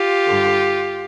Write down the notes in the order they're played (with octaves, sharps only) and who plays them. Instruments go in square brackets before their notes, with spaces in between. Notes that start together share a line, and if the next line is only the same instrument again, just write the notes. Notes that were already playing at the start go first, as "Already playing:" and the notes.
Already playing: [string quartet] F4 G4
G2 D3